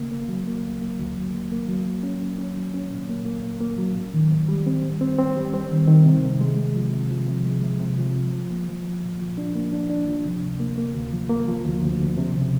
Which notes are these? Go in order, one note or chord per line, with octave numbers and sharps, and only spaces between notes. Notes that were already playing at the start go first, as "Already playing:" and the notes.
Already playing: C#3 A#3
A#3
F#3
A#3
D2
A#3
D2
F#3
A#3
A#3
F#3
A#3
C#4
A#3
C#4
F#3
C#4
A#2
A#3
A#3
A#3
A#3
F#3
G#2
D#3
G#2
G3
C4
G#2
C4
C4
G3
C4
D#3
D#3
C3
C3
G#3
C3
F3
C3
F3
C3
G#3
C3
C3
F3
F3
F3
A#3
F3
F3
A#2
F3
D4
A#3
D4
D4
F3
C3
D2
A#3
A#3
D2
F3
A#3
F3
D2
D2
D2
C3
C#3